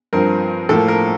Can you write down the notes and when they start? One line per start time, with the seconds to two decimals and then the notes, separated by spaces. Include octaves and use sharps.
0.13 G2 F3 C4 A#4
0.69 A2 F3 A#3 A4
0.88 A#4